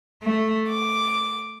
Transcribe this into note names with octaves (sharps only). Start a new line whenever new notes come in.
A3
D6